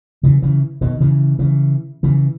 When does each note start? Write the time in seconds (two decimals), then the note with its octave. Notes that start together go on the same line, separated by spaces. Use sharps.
0.23 C#3 E3
0.42 C#3 E3
0.81 B2 D#3
1.00 C#3 E3
1.39 C#3 E3
2.03 C#3 E3